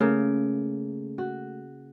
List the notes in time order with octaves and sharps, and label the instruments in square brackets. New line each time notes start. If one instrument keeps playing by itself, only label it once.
[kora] C#3 A#3 [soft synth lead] A3
[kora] F#4